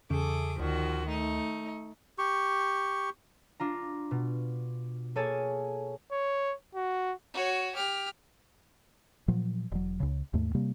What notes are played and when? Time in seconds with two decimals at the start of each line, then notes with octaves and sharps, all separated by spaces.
0.10 E2 C#3 G#4 A4 D6
0.59 D2 D#3 F3 F#4
1.07 A3 D#4
2.18 G4 C#6
3.60 D4 F4 A#5
4.11 B2
5.16 A#3 G#4 A4 C#5 G#5 A5
6.12 C#5
6.75 F#4
7.34 F#4 C#5
7.75 G4 F6
9.28 A#2 F3 F#3
9.72 E1 F#3
10.00 C#2 C#3
10.34 D#2 G#2 A3
10.55 C3 G3 A#3